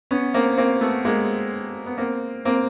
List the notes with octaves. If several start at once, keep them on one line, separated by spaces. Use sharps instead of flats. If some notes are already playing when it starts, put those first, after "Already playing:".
B3 C#4
A#3 C4
A#3 C4
A3 B3
G#3 A#3
B3
A#3 C4
A#3 C4